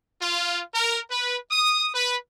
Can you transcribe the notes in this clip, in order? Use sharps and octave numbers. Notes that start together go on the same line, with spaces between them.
F4
A#4
B4
D#6
B4